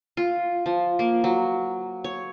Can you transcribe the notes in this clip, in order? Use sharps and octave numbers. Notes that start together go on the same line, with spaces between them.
F4
F3
A#3
F#3
C#5